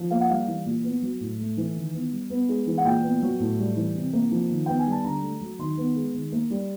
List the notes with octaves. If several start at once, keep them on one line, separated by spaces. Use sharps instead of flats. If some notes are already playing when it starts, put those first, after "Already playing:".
Already playing: F3
A#3 F5
F#5
G3 F5
E3
A#2
B3
F#3
A2
A3
E3
D#3
B3
G3
B3
G#3
E3
F#5
A#2 G5
B3
F#3
A2
G3
E3
C3
A#3
F3
D#3
B3 G5
G#5
G3
A5
D3 A#5
A3
F#3
D#3 C6
B3
G#3
D#3
A#3
G3